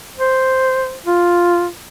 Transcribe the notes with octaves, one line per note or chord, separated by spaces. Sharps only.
C5
F4